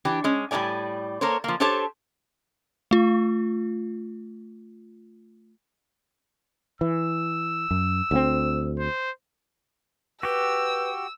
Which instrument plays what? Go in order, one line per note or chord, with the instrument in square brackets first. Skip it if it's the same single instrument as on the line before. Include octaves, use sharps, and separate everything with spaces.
[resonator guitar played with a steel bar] E3 D4 G4
G#3 C#4
A2 G3 A#3 D5 G#5
A#3 A4 A#4 C5 C#5
F3 A#3
D4 G4 A4 C5 C#5 A5
[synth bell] A3 F4
[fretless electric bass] E3 [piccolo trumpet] E6
[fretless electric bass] F#2
D2 F3 C4
[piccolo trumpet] C5
[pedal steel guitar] F#4 G4 [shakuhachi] B4 [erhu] E6